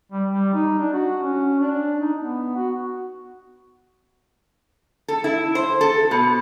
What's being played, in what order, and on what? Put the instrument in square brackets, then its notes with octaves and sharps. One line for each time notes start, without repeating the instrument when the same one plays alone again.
[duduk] G3
G3
D#4
D4
F#4
C#4
D4
D#4
B3
F#4
[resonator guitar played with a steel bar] A4
E4
C5
A4
B2